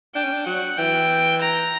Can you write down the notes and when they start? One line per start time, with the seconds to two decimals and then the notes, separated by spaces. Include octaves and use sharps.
0.15 D4 G5
0.24 C#4
0.33 D4
0.46 F#3 F#5
0.78 E3 G5
1.41 A#5